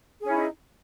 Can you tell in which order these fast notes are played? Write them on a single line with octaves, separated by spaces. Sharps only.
G#4 C#4 E4 D#4